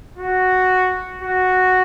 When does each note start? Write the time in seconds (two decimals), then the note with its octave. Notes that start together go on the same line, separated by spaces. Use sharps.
0.18 F#4
1.22 F#4